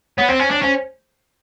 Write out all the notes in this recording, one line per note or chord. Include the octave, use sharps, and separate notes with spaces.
B3 C#5
C4 C5
C#4 C5
D4 C#5
C#4 C5